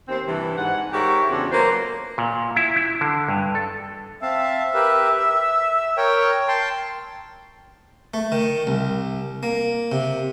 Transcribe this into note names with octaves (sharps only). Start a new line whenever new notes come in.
D#2 C4
G2 C3 E3
G#2 F#5
G#2 G4 A#4 C#5 E5
E2 C#3 C4 D4 F#4 A4
F#3 A#3 F4 B4 C5
A#2
E4
E4
D3
G2
A4
C4 E5 F5 A5
G4 A#4 B4
E6
A#4 C#5 G5
G5 A5 C6
A3
D#3
C2
A#3
C3